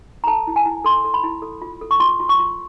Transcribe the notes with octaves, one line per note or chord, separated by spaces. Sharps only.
A#5
A4 A5
E4
G#5
E4
A4 C6
A4
B5
E4
A4
F4
A4
C#6
F4 C6
F4
C#6
F4